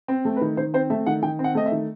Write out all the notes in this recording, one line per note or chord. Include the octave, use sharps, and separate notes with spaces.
C4
A3
B4
D#3
D#3 C5
C4 C5
A3 E5
D#3 F#5
D#3 G5
C4
F#5
A3 D#5
E5
D#3